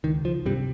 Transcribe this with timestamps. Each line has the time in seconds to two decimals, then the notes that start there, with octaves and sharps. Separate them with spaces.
0.04 C#2 D#3
0.25 F3
0.46 G2 C3 G3